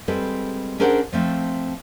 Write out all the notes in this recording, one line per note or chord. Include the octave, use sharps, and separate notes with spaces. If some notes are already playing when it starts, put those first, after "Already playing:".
G3 G#3 C4 A4 B4
C#4 D4 G#4 A#4 C5 F#5
F3 A3 C4